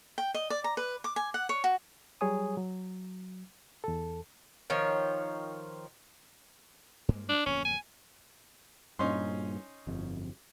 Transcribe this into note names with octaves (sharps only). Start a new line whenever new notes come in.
G5
D#5
D5
A#5
B4
D6
G#5
F#5
C#5
F#4
F#3 G3 G#4 C#5 G#5 D#6
F#3
E2 A4
D#3 F3 C#5
G2 G#3 A#3
D4
D1 F2 A#3 C#4
G#5
G2 A#2 C#4 D#4 C6
G1 F2